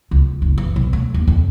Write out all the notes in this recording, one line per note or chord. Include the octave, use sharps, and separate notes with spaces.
C#2
F#1
E3
B1
A3
D#2
F2